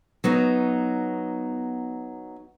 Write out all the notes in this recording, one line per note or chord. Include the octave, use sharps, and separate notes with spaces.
F#3 B3 D#4